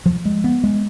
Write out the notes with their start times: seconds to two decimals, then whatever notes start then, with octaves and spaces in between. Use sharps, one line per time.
0.06 F3
0.25 G#3
0.44 B3
0.64 G#3